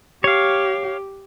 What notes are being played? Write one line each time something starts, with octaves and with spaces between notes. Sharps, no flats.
G4 C#5 F5